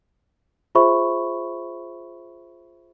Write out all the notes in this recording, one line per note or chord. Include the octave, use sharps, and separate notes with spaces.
F4 G#4 C5 E5 B5 C#6